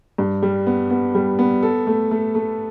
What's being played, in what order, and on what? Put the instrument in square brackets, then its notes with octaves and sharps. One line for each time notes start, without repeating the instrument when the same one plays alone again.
[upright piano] G2
G3
B3
B3
G3
B3
A4
A3
A3
A3